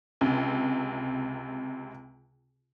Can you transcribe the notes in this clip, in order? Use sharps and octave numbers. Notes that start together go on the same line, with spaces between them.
C#2 C3